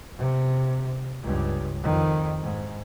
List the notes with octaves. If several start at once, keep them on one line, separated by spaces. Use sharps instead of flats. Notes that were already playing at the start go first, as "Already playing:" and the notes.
C3
C#2 G2
F2 D#3
G#2